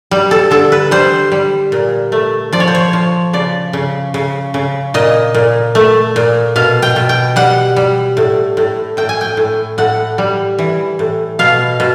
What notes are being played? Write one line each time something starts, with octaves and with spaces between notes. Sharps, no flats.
G3
A4
D3 A4
B4
G3 C5
G3
A#2
A3
F3 D5
C#5
C5
C#5
F3
C#3 D5
C#3
C#3
C#3
A#2 D#5
A#2
A3
A#2
B2 F5
G5
B2
G5
G3 F#5
G3
A2
A2
A2 G5
G#5
G5
A2
A2 F#5
G3
E3
A2
B2 F5
B2